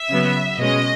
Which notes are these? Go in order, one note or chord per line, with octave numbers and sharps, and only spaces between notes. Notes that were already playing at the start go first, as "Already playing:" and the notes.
Already playing: E5
C#3 F#3 B3
B2 G#3 C#4 D#5